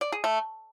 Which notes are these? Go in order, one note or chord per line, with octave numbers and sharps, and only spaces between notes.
D5
G#4
A3